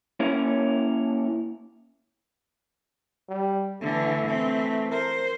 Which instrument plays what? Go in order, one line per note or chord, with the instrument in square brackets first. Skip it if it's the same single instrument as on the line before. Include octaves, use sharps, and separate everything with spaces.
[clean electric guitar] A#3 C#4 E4 C#5
[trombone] G3
[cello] D3 E3 [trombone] A3
[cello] E3 C4
[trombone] A#4 [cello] C5